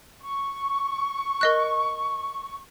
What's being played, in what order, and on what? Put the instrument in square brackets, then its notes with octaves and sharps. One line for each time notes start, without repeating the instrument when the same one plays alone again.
[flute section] C#6
[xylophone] A#4 D#5 F#6